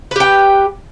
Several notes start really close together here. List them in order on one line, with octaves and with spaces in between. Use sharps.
B4 G4 G5